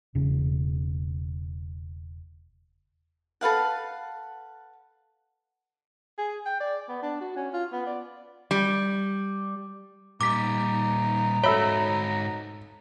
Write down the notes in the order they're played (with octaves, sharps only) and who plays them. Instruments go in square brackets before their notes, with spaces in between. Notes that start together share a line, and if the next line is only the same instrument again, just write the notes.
[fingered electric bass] E1 C#3
[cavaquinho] A4 B4 F5 F#5
[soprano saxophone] G#4
G5
D5
B3
D4
F#4
C#4
F4
B3
D5
[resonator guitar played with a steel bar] G3
[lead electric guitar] A#2 G3 [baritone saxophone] D#4 [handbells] D6 B6
[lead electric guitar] G#2 F#4 [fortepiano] A4 E5 B5 [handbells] C#5